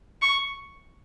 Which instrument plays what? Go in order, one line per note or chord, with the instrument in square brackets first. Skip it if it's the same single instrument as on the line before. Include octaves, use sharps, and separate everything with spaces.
[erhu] C#6